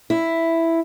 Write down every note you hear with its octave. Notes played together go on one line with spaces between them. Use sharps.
E4